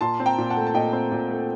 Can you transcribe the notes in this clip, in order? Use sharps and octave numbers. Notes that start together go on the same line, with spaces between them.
A#2 A5 C6
C4
G5 A#5
A#2
F#5 A5
A3
A5
A#2 D#5 G5
C4
A#2
A3